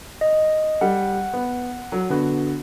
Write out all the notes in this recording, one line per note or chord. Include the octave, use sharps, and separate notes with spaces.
D#5
G3 F#5
B3
F#3
D3 B3 F#4